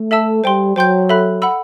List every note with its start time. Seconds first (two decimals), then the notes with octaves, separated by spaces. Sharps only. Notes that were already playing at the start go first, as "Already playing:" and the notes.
Already playing: A3
0.11 A4 E5 A5 E6
0.44 G3 C5 G5 C6
0.76 F#3 C5 G5 C6 G6
1.09 A4 E5 B5 F#6
1.42 F#5 B5 E6